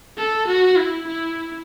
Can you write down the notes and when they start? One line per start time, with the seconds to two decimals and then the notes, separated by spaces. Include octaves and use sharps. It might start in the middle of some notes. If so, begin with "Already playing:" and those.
0.18 A4
0.47 F#4
0.77 E4
1.07 E4